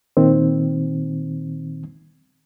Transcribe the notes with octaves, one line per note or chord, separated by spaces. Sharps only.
A#2 D#3 C4